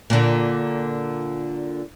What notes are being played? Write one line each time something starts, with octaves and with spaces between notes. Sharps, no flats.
A#2 D3